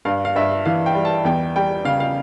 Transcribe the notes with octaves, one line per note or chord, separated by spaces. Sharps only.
G2 F5
F5
G2 E5
E3 F5
G5
G3
A5
E2 G5
G3 G5
C#3 F5
F5